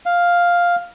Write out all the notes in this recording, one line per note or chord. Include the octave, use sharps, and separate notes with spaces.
F5